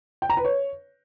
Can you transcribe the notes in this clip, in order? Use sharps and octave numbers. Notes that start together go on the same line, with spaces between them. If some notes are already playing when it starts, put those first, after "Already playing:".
G5
A#5
B4
C#5